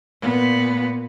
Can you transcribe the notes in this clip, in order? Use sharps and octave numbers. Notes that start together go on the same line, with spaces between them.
A#2 B3